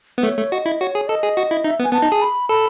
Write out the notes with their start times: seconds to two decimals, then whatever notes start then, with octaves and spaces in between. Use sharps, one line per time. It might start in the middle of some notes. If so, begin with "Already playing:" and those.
0.18 B3
0.23 A3 C#5
0.37 A3
0.52 F#4 D#5
0.66 E4
0.81 F#4 C#5
0.95 G#4
1.08 A4 D#5
1.23 G#4
1.37 F#4
1.51 E4
1.64 D#4 E5
1.79 B3
1.84 G#5
1.93 B3 A5
2.02 D#4
2.12 G#4
2.22 B5
2.49 A4 B5